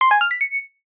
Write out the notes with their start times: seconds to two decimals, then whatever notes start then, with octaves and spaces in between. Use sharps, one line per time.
0.01 C6
0.11 G#5
0.21 F6
0.31 B6
0.41 C#7